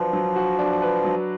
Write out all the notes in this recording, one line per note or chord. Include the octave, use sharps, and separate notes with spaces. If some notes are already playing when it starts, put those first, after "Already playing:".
Already playing: F3 F#3 D4 F#4 B4
F#3
F#4
D4
B4
F#3